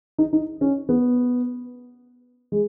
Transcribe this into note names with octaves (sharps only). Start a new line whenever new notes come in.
D#4
D#4
C#4
B3
G#3